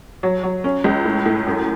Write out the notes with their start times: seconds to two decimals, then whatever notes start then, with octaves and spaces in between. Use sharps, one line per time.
0.23 F#3
0.43 F#3
0.64 C#4
0.84 C#2
1.05 A2
1.26 A2
1.46 F#2